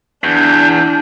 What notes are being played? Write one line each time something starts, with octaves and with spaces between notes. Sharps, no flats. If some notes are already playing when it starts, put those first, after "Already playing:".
E2 D4 G6